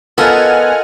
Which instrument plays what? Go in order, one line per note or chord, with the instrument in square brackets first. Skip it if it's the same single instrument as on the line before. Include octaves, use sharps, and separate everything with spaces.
[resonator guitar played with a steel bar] B3 [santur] F4 D#5 [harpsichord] A4 A#4 [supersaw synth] F#5 G#5 F6